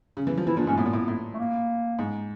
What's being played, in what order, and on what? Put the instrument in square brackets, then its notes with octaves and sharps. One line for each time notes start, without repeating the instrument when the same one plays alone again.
[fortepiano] C#3
E3
F3
[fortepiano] E3 [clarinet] E4
[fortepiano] A#2 [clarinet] D4
[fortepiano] G#2 [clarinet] C#4
[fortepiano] A2 [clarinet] B3
[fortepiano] A#2
A2
A2
[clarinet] A3
A#3
[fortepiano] G#2